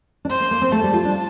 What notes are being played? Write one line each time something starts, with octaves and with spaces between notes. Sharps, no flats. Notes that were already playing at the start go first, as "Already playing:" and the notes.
D4
C4 C5
A#3
A#3
C4
A3 A5
G3
F4
D4